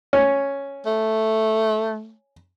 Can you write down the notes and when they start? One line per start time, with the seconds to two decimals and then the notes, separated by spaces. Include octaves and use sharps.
0.13 C#4
0.86 A3